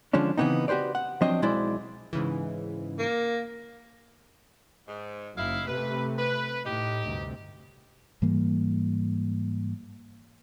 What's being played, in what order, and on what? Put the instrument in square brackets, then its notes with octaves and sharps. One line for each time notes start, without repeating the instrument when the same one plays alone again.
[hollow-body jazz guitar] D3 F3 G#3 C#4 D4
C#3 E3 B3 C4 D#4
F#4 G4 B4 C5 D5
F#5
F3 F#3 C4 D4 D#5
B1 G#3 E4 C5 D5
[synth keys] G#2 C#3 E3
[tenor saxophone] A#3
[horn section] G#2
[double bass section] F#1 F#2 [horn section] D#4 E4 F5
[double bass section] C3 A3 [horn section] B4
[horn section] B4
[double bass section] A2 [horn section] D#4 G4
[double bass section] D2 G2 C3
[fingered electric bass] G#2 E3 G3 A#3